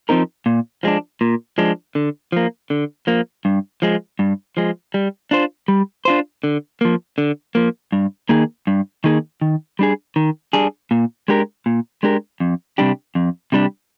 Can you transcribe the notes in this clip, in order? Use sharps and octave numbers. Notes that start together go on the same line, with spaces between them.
F3 C4 D#4 A#4
A#2
F3 G#3 D4
A#2
F3 G#3 D4
D3
F3 A#3
D3
F3 A#3
G2
F3 G#3
G2
F3 G#3
G3
D4 F4 C5
G3
D4 F4 C5
D3
F3 A#3
D3
F3 A#3
G2
D#3 A#3 D#4 G#4
G2
D#3 A#3 D#4 G#4
D#3
G3 D4 G#4
D#3
G3 D4 G#4
A#2
G#3 D4 G4 A#4
A#2
G#3 D4 G4 A#4
F2
C3 G3 D4 G4
F2
C3 G3 D4 G4